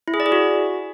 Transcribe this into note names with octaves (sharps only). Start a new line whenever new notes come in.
E4
G#4
D5
G#4
F#4